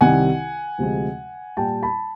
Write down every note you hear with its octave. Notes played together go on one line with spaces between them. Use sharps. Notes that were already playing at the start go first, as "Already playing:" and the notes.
C2 C3 D#3 G3 F#5 G#5
D2 C3 F3 G#3
A#2 G3 G5 A5
A5 B5